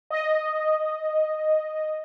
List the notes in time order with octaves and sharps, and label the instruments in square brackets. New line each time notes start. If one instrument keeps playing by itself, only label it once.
[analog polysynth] D#5